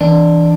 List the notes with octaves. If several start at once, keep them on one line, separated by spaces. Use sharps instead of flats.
E3 D4